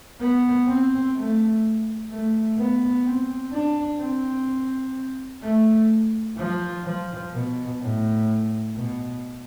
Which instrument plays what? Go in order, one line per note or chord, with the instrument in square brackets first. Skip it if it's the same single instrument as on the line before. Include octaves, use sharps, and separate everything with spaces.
[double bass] B3
C4
A3
A3
B3
C4
D4
C4
A3
F3
F3
B2
A2
B2